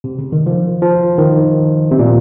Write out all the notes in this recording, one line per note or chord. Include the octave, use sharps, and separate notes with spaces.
C3
C#3
D#3
F3
F3
D#3
C3
A#2